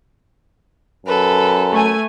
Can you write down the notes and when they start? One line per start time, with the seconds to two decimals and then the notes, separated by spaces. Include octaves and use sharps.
1.06 F#2 A4 B4
1.71 A3 G#5